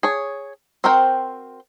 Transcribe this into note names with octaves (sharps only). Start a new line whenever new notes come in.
G#4 C#5
C4 F#4 A#4 C5 G5